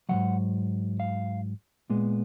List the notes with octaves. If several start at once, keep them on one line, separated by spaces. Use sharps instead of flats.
G#2 D#3 F#3 F#5
F5
A#2 G#3 B3